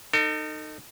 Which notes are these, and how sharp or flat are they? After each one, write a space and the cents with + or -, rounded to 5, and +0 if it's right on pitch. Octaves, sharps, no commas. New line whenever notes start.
D#4 -15 A4 +40